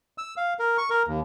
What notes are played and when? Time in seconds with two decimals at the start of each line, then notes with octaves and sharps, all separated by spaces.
0.18 E6
0.37 F5
0.59 A#4
0.78 C#6
0.90 A#4
1.07 D#2